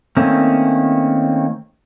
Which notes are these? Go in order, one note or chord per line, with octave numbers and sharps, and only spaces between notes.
D#3 A3 A#3 C4 C#4